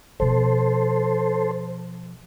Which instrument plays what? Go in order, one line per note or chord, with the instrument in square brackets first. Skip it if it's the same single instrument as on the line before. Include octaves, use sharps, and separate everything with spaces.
[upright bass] B2 F3 [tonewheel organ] A4 C5